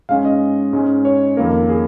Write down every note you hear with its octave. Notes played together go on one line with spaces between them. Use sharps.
G#2 G#3 C#4 F5
D#5
G#2 G#3 C#4
C#5
F2 D#3 A#3 A#4
G#4